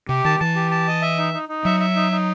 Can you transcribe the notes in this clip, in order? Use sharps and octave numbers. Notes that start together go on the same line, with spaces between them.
C3 G4
D#3 A5
E3 A5
G4
A5
D#5
E5
D#4
D#4
D#4
F#3 E5
E5
D#4
D#4